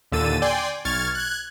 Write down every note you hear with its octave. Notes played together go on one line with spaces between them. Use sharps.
D#2 A#2 D3 E6 A6 D#7
D5 G5 G#5 C6
B1 C#6 F6 G#6 A6
F#6 G#6